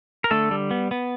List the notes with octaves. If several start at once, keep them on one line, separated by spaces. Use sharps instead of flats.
A#4
D3 A3 A4
G3
B3
B3